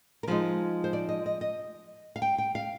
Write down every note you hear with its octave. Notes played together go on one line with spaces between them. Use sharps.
A#4
F3 G#3 D#4 C5
C5
D5
D#5
D#5
D#5
F5
G5
G5
F5